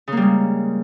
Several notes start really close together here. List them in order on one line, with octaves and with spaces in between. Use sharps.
C#3 A#3 G3 G#3